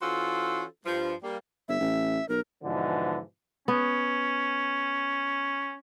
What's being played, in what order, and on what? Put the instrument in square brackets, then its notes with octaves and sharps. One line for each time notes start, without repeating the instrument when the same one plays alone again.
[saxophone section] E3 C#4 F4 F#4 A4 C5
G2 F3
G3 A#3
[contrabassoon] G1 [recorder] E5
[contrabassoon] A1
[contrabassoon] B1 [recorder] A#4
[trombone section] G#2 B2 D3 E3 F3
[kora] B3 [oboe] C#4